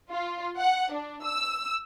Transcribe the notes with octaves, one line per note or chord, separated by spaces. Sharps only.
F4
F#5
D4
E6